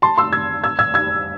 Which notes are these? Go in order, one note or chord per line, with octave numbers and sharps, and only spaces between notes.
A5 C6
C6 E6
E6 G#6
E6 G#6
E6 G#6
E6 G#6